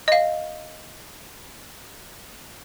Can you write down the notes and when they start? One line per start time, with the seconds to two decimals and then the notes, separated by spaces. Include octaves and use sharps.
0.08 D#5 F5